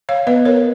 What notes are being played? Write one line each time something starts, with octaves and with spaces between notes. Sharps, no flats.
C#5 F5
B3 B4 D#5
A#4 C#5